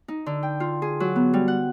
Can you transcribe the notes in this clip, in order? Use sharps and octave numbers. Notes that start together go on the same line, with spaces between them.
D#4
D3
G5
F4
G#4
F#3
B3
G3
F#5